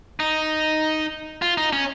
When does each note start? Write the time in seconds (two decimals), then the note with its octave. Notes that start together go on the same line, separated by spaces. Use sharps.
0.20 D#4
1.42 F4
1.57 D#4
1.73 C#4